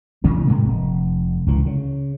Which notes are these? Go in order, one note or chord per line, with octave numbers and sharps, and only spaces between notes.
C3 E3 A3 D4
A2 C3 G#3 A#3
F1
C#2 E3
C#3